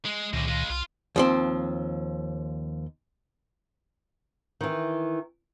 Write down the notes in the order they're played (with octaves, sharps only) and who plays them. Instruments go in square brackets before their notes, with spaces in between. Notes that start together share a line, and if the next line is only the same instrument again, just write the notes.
[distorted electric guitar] G#3
[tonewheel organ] C#2 A#2 D#3 [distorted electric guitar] F#2 D3
[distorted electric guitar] G#3 F4
[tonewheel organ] C2 [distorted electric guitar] F4
[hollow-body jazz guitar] D#2 F3 C4
[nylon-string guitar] D#3 E3